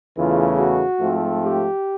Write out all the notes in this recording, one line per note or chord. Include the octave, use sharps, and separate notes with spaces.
E2 C#3 E3 A3 F4
F#4
G#2 F3 A3 C4
G4